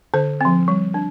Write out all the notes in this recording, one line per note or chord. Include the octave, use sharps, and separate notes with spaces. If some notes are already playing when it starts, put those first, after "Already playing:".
D3 C5
F3 C4
G3
D4